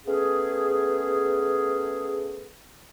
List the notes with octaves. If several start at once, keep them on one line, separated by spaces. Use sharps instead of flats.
A3 B3 C#4 G#4